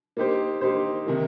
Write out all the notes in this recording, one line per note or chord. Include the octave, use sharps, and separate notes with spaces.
A#3 D#4 G4 C5
A#3 D#4 G4 C5
C3 D#3 A#3